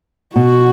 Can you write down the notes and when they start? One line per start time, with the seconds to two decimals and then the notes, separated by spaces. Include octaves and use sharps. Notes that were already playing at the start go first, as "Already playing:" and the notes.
0.35 B2 F#4